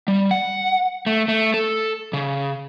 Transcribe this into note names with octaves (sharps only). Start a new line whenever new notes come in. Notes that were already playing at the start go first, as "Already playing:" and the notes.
G3
F#5
A3
A3
A4
C#3